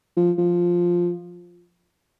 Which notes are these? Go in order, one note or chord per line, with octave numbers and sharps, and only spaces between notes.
F3
F3